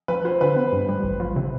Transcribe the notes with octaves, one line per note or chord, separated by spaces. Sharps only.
F3 B4
F4 C5
D3 B4
B3
G2
G3
A1
F3
C3